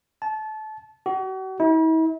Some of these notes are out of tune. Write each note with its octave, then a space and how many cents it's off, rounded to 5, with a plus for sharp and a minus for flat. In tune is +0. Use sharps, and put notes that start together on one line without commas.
A5 -25
F#4 +40
E4 -45